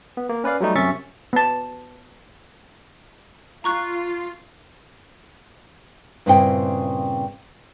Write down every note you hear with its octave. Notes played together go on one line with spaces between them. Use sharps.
B3
A#3
C#4 B4 D5 F5
F#3 G3 A3 D#4
F#2 C3 C#4 E5 C#6 A6
B3 A5
F4 A#5 C#6 F#6
G2 A#2 C#3 C4 E4 G5